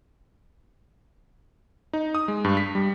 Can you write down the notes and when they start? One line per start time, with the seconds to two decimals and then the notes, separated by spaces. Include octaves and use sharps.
1.93 D#4
2.15 D#6
2.28 G#3
2.44 G2
2.57 B6
2.75 G3